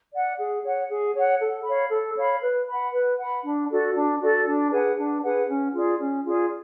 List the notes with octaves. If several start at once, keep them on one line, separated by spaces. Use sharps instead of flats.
D5 F#5
G#4
C#5 F#5
G#4
C#5 F#5
A4
C#5 F5 B5
A4
C#5 F5 B5
B4
F#5 B5
B4
F#5 B5
D4
F#4 A4 D5
D4
F#4 A4 D5
D4
G#4 B4 F#5
D4
G#4 B4 F#5
C#4
F4 G#4 D5
C#4
F4 G#4 D5